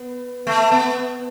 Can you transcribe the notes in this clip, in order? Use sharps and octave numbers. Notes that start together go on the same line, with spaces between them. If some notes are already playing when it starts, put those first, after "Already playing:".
Already playing: B3
A3
B3